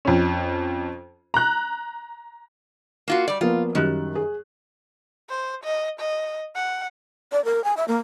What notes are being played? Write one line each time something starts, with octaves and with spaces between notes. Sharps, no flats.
F2 C#4
A#5 F#6
A#3 F4 F#4
G3 D5
F3 A#3 B3 F4
F#2 D#3 G3 F#6
G#4
C5
D#5
D#5
F#5
D5
A#4
G#5
E5
A#3